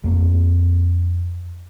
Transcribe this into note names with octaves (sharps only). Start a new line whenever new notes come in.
F2 A#3